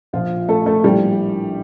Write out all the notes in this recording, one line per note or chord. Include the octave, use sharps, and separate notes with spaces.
A#1 A#2 F3 F4
A3 A4
A3 A4
A#1 A2 F3 G3 G4